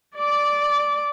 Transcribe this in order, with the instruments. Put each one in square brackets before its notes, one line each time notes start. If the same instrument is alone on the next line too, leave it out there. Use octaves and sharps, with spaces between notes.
[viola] D5 D6